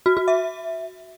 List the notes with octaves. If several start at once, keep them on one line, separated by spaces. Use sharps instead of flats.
F#4
F#4
E5